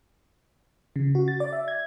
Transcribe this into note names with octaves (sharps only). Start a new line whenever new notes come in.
C#3
F#4
A6
D5
E5
G#6